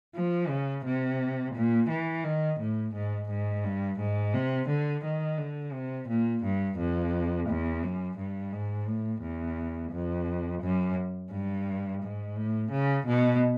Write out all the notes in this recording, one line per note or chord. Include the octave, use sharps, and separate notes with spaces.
F3
C#3
C3
A#2
E3
D#3
A2
G#2
G#2
G2
G#2
C3
D3
D#3
D3
C3
A#2
G2
F2
E2
F#2
G2
G#2
A2
E2
F2
F#2
G2
G#2
A2
C#3
B2